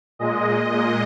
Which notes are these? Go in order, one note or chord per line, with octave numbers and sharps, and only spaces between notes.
A#2 G#3 D#5
A#2 G#3